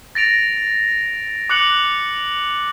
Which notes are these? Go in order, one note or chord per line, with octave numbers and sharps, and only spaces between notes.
A6 A#6 D7 F7
D6 F#6 C#7 F#7